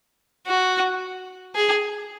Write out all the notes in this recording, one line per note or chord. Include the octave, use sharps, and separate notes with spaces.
F#4
G#4